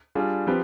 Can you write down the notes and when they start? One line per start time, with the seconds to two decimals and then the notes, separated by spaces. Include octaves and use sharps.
0.15 G3 D4 F4 G#4
0.47 F3 C4 G4 B4